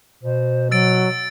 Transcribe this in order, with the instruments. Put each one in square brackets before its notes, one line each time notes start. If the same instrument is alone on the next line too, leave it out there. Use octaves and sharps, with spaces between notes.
[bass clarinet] B2 [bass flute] C5
[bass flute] F#3 [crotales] E6 A6 D7